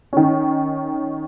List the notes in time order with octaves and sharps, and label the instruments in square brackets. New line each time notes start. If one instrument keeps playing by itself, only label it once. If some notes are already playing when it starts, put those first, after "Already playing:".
[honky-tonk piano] D#3 C#4